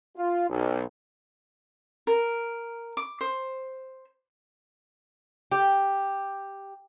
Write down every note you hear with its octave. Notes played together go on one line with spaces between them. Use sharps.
F4
B1
A#4
D6
C5
G4